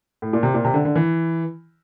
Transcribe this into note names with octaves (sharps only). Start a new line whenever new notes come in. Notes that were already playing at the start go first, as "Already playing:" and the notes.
A2
A#2
C3
A#2
C3
D3
D3
E3